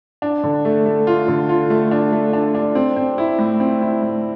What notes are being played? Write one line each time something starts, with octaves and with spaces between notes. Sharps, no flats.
D4
D3
A3
A3
F4
D3
F4
A3
D4
A3
D4
D4
C4
C4
E4
A2
C4
E4
A2